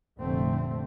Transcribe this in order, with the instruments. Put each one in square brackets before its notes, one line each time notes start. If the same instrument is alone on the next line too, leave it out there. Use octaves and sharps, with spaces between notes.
[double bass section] F1 A#2 D3 A3 C4